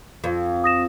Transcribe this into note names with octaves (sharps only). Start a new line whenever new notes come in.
F2
D#6 A#6 E7